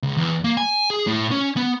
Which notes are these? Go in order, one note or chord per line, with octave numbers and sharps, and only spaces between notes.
C#2
E2
A#3
G#5
G#4
A2
C#4
B3